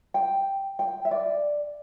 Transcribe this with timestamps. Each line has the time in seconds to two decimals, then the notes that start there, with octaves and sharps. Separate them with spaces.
0.14 G5
0.79 G5
1.05 E5
1.11 D5